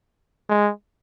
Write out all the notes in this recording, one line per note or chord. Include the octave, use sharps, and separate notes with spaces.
G#3